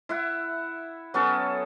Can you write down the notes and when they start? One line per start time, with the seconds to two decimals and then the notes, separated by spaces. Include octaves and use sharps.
0.09 E4 E5 F#5
1.14 F#3 B3 C#4 A4